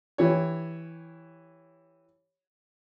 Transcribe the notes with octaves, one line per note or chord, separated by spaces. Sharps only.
E3 G4 C#5